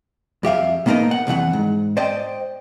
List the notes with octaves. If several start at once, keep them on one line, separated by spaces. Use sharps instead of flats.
F2 G4 E5 F5
A2 A#3 B3 D#4 A#4 D#5
F#5
C2 F2 E3 F#5
G#2
C5 D5 D#5 G5